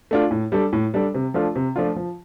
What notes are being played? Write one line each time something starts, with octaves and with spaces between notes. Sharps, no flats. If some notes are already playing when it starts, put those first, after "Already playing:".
A3 D4 F4
A2
G3 D4 A4
A2
G3 D4 A4
C3
F3 A3 D4 F4
C3
F3 A3 D4 F4
F3